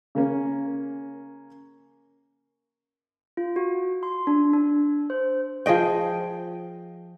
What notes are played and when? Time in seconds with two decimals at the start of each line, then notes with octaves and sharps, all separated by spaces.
0.15 C#3 A#3 C#4
3.37 F4
3.56 F#4
4.03 C6
4.27 D4
4.54 D4
5.10 C5
5.66 F3 G#4 D#5 G5